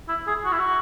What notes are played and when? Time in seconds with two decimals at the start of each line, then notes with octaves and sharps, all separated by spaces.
0.09 E4
0.27 G#4
0.45 F#4
0.52 E4
0.59 F#4